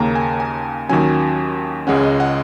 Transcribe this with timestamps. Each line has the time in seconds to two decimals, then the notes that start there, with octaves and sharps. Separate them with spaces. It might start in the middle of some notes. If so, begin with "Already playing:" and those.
Already playing: D#2 C#3 A#3 C#4 A#5
0.15 G#5
0.40 G#5
0.89 D#2 D#3 F#3 C#4 G#5
1.87 C#2 C#3 G#3 C#4 F#5
2.04 D#5
2.20 F#5